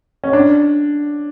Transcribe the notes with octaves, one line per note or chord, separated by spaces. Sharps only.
C#4
D4